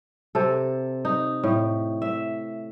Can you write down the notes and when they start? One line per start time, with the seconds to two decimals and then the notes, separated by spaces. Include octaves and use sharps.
0.35 C3 A4
1.05 D#4
1.44 A2
2.02 E5